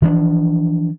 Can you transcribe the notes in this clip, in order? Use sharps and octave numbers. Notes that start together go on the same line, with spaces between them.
E3 F3 A#3 D4